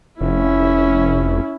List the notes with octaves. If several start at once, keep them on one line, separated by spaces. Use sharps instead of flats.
F1 C#4 E4